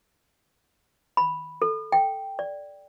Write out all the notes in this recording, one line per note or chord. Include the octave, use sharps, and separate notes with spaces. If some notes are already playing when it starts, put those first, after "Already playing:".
B5
A4
G5
D5